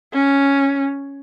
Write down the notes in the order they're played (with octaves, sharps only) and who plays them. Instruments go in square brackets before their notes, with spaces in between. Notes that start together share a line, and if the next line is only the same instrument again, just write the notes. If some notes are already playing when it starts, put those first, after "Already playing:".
[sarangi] C#4